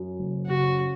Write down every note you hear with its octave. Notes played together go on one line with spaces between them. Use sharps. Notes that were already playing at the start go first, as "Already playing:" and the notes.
Already playing: F#2
F#1
C#3 F#4